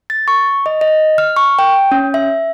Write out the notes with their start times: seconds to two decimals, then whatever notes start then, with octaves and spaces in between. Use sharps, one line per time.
0.10 A6
0.28 C#6
0.66 D#5
0.81 D#5
1.18 F6
1.37 C#6
1.59 G5
1.92 C#4
2.14 E5